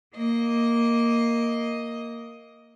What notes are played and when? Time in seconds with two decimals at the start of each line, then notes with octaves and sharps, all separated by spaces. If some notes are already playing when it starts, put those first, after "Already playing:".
0.13 A#3 D#5